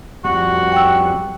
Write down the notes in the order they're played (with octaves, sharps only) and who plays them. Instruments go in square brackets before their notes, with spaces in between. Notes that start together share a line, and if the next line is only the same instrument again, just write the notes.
[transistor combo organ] F2 G3 F#5 [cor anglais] F#4
[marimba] G5 E6